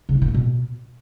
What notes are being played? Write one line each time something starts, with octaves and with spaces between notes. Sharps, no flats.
C#3
A2
D#3
A3
B2